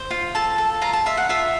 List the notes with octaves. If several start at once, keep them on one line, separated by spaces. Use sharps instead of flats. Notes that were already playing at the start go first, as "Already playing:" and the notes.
Already playing: C5
F4
A4 A5
A4
F4 A#5
A5
F4 E5
F#5
F4 E5